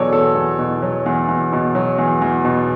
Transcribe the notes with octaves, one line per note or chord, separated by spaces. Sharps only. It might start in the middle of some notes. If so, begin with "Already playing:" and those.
Already playing: E2 B2 F#3 A4 C#5 D5
E2 A4
E2
B2
F#3
E2
E2
B2
F#3
E2
E2
B2